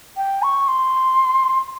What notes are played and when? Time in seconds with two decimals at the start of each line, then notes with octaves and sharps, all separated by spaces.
0.17 G5
0.43 C#6
0.68 C6